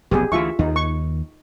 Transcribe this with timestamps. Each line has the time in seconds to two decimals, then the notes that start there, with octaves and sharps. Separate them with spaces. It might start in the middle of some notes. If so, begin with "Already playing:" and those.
0.11 F1 B1 B3 G4 G#4
0.32 D2 E3 F4 E5 C#6
0.59 D#2 D#4
0.76 C#6